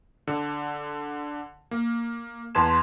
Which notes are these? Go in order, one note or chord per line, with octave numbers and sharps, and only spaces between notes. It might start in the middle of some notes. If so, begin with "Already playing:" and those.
D3
A#3
E2 B4 A5 C6 G#6 E7